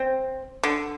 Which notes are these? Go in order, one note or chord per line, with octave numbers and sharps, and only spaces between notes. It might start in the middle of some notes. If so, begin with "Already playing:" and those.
Already playing: C4
D3